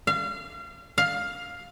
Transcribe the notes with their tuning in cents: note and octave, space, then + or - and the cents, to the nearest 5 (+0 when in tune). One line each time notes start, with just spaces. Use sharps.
F5 -30
F5 +10